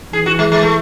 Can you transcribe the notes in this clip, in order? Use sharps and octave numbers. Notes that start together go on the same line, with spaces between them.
E3 G#4
F#4
G#3
G#3
A3